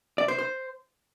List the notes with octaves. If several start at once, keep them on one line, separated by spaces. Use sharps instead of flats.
D5
C5
C5